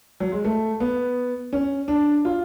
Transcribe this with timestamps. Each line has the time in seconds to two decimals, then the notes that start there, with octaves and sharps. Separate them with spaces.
0.20 F#3
0.32 G#3
0.45 A3
0.80 B3
1.53 C#4
1.88 D4
2.25 F4